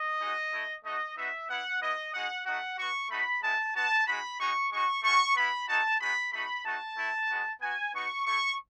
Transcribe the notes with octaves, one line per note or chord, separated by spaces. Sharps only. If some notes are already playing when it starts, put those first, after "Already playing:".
Already playing: D#5
G#3 D#4 F#4
A3 E4
A3 D#4 F#4 D#5
B3 D#4 F#4 E5
B3 E4 F#5
B3 E4 D#5
G#3 D#4 F#4 F#5
A3 D#4 F#4 F#5
B3 F#4 C#6
A3 D#4 F#4 B5
G#3 B3 E4 A5
B3 F#4 A5
G#3 D#4 F#4 B5
G#3 D#4 F#4 C#6
G#3 D#4 F#4 C#6
A3 C#4 F#4 C#6
B3 E4 B5
A3 D#4 F#4 A5
G#3 B3 D#4 F#4 B5
A3 D#4 F#4 B5
A3 D#4 F#4 A5
A3 E4
G#3 B3 F#4
B3 F#4 G#5
B3 D#4 F#4 C#6
A3 E4 C#6